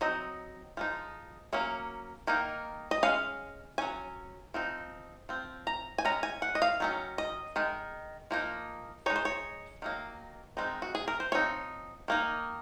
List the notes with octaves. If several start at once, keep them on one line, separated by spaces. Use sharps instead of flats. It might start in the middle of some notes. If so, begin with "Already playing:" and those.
F#3 C4 D#4 D#5
F3 G#3 D#4
F#3 A#3 C#4
D#3 A#3 D#4
D#5
G#3 C#4 F5
F#3 C#4 G#5
F3 C4 D#4
F3 C4
A#5
G#5
G#3 C#4 A#5
G#5
F#5
D#5
F5
D#3 F#3 C#4
D#5
D#3 G#3
F3 A#3 D#4
G#3 D#4 C#5
C5
C#5
D#3 F#3 A#3
D#3 G#3 C4 D#4
F#4
G#4
A#4
C5
F3 C4 D#4 C#5
D#3 A#3 D#4